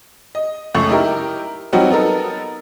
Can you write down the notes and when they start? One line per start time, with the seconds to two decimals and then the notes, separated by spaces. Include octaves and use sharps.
0.35 D#5
0.75 C#2 F#2 A3 C#6
0.89 D#4 E4 G4 A#4
1.73 F#3 G3 C4 D#4 F#4
1.90 B3 D#4 A4 A#4